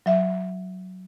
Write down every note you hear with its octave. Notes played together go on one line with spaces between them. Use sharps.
F#3 E5